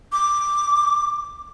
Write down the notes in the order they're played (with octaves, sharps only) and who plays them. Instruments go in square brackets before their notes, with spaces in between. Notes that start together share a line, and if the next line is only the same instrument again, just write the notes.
[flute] D6